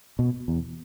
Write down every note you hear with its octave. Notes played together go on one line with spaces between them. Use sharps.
B2
E2